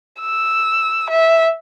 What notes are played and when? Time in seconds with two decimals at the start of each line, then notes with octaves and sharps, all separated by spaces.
0.21 E6
1.10 E5